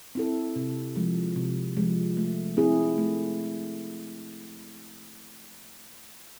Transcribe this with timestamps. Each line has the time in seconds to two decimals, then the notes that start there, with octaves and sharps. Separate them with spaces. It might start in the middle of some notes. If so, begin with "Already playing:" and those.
0.15 C4 E4 A4
0.56 C3
0.96 F3 G#3
1.36 C3
1.77 F3 G#3
2.17 A3
2.57 C4 E4 G#4
2.98 A3